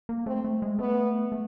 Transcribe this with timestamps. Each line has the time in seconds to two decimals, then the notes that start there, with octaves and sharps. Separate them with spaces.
0.09 A#3
0.26 A3 C4
0.44 A3
0.62 G#3
0.79 A3 B3
1.32 A3